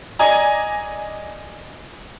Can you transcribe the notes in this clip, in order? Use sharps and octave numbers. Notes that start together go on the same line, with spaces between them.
D5 D#5 G#5 A#5